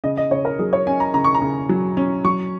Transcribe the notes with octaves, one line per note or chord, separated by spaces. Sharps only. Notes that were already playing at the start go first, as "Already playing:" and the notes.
C#3 D#5
D#5
C#3 C#5
A#4
F#3 G#4
C#5
C#4 G#5
A#5
C#3 A#5
C#6
A#5
C#3
F#3
C#4
F#3 C#6